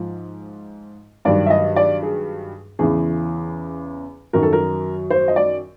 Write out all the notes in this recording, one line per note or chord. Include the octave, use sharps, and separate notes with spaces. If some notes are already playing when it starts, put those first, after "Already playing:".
Already playing: G#2 F3
G2 D#3 F#3 D5
E5
D#5
D5
G#4
E2 C#3 E3 G#4
F#2 D#3 F#3 A#4
A4
A#4
C5
D#5
D5